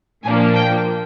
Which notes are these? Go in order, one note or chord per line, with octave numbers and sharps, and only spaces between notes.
A#2 F3 A#3 D4 G#5
G5